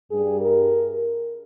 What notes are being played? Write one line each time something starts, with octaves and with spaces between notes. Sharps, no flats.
G2 G3 G#4
A#4